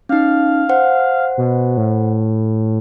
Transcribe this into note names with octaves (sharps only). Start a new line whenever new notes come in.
C#4 D#4 F5
C5 F#5
B2
A2